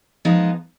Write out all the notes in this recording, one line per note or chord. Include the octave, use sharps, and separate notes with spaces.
F3 G#3 B3 D#4